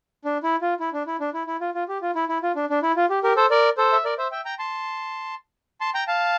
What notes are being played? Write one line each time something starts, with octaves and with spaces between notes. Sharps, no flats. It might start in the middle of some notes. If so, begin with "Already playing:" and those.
D4
E4
F4
E4
D4
E4
D4
E4
E4
F4
F4
G4
F4
E4
E4
F4
D4
D4
E4
F4
G4
G4 A#4
A4 C5
A#4 D5
A4 C5
E5
A#4 D5
C5 E5
E5 G5
G5 A#5
A5 C6
A5 C6
G5 A#5
F5 A5